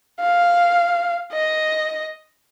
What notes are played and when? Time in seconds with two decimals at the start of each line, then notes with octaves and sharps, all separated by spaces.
0.21 F5
1.33 D#5